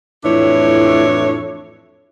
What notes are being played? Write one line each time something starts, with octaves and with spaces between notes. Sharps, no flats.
F2 A2 E3 D4 E4 C#5